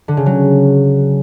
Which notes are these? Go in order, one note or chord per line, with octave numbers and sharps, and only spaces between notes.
D3
C#3
F#3